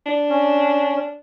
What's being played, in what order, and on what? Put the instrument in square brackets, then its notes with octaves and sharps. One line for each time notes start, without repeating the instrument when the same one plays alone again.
[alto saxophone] D4
[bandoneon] C#4